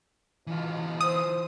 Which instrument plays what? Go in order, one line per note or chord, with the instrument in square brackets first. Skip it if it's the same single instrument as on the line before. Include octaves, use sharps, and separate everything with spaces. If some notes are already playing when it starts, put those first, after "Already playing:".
[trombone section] C#2 B2 [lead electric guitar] E3 F4
[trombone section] C5 [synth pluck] D#6